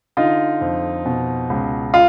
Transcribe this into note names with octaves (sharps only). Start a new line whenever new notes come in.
D3 D#4 F4
F2
B2
C#2
F4